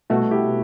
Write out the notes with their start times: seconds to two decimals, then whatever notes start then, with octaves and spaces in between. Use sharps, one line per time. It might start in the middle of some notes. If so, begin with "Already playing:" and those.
0.10 C2 B2 A3 F#4 A4
0.31 E4 G4